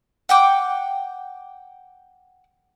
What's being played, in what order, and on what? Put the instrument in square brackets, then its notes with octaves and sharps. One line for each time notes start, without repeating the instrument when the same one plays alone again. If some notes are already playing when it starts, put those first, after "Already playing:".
[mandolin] F#5 G5 D6